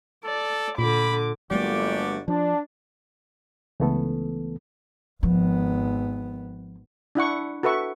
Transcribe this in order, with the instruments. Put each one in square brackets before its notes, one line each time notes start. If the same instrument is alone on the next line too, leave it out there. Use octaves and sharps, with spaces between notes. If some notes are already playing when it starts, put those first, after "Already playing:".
[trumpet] A4 [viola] D5
[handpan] A#2 [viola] D3 D6 [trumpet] B5
[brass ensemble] G1 [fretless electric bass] F#3 G#3 A#3 [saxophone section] F#4 G4 D5
[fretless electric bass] F3 [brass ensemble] D4
[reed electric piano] C#2 E3 A3 B3 A4
[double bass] G#1 B3 [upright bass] F3
[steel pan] D4 E4 F#5 C#6
F#4 A4 B4 E5 C#6